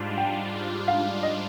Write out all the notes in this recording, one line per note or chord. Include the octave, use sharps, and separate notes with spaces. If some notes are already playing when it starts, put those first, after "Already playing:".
Already playing: G#2 G3 D4 F4
G5
G#2 G3 D4 F4
F5
D#5